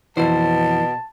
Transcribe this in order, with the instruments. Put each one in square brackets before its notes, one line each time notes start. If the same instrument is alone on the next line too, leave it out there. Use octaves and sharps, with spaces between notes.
[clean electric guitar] F2 C5 [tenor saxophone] B2 [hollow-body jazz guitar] E3 [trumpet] A5